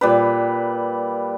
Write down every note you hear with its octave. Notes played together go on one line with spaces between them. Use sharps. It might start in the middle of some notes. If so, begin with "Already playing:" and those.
A#2 G3 B4